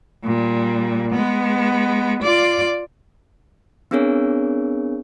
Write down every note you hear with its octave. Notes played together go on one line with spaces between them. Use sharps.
A#2 G3
G#3 B3
F4 D5
B3 C4 D4 G#4 A#4 C#5